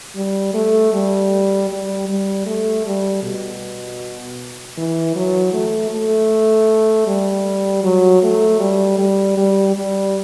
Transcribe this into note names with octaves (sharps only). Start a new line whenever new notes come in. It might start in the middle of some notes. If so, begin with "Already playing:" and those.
G3
A3
G3
G3
G3
A3
G3
B2
E3
F#3
A3
A3
G3
F#3
A3
G3
G3
G3
G3